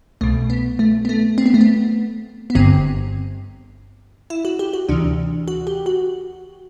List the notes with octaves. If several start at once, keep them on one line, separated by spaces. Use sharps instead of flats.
C2 B2 A3
B3
A3
B3
A3
C4
B3
A3
B3
B3
G1 G2 D3 C4
E4
F#4
G4
F#4
D2 C3 E3 D4
F#4
G4
F#4